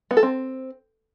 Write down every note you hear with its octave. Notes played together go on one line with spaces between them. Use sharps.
B3
A4
C4